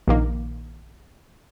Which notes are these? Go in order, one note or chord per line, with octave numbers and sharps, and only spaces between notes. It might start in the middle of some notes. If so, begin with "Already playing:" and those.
A#1 D#3 A#3